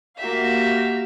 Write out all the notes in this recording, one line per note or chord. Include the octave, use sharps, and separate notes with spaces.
A#3 F#4 G4 E5 F5